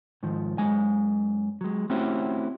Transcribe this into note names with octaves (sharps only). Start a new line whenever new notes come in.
G#2 D#3 F3
F#2 G#3 G#5
F#3 G#3
A3 C4 C#4 E4 F#4 G4